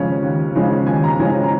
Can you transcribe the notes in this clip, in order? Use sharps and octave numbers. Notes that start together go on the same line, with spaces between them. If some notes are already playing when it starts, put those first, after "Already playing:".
Already playing: D#2 C#3 F3 G#3 C#4 G#5
D#2
C#3 F3 G#3 C#4
D#2 G#5
A#5
C#3 F3 G#3 C#4 G#5
A#5